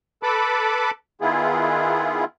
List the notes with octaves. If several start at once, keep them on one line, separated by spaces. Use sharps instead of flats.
A4 B4 A5 B5 D6
D#3 B3 E4 F4 G#4